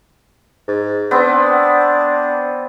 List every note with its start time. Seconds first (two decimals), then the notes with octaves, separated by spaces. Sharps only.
0.68 G#2
1.11 B3 C4 D4